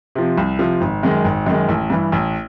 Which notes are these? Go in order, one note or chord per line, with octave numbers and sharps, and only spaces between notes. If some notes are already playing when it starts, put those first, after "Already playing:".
C3 F3
C2
C3 F3
G#1
F#2 D#3 G#3
G#1
F#2 D#3 G#3
A1
G2 E3
A1